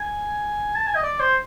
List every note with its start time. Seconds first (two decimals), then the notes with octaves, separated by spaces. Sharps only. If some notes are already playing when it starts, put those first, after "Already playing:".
Already playing: G#5
0.76 A5
0.87 G#5
0.96 D#5
1.04 D5
1.20 C5